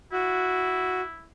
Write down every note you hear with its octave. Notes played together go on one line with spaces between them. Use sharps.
E4 F#4